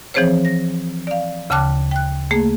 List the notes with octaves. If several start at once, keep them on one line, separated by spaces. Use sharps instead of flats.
E3 F3 C4 G#4 C5 C#5
A#6
D5 F5
D2 C#3 G5 A5 D6 F#6
G5 F#6
A3 A#3 G#4